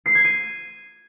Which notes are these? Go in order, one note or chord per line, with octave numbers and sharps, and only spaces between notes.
C7
G#6
D#7